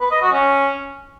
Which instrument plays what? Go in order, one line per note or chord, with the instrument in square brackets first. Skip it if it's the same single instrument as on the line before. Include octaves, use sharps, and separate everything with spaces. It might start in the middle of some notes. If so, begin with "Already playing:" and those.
[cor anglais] B4
D#5
F#4
C#4